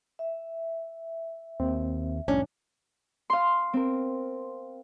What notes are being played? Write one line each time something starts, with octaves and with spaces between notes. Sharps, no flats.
E5
D#2 C4
C2 F2 A2 C#4 D4
F5 C6
C4 A#4